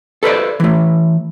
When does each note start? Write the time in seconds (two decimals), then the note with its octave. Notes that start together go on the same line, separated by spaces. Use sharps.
0.23 A4 B4 C5 D5
0.60 E3 A3